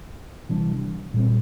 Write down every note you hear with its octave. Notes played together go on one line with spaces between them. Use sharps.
C3 E3 G3 D4
A#2 G3 C4